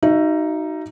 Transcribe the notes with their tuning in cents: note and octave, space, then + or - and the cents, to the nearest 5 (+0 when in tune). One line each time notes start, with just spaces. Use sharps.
D#4 +0 F#4 +10 E5 +35